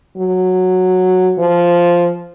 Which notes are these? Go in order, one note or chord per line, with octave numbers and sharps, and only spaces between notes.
F#3
F3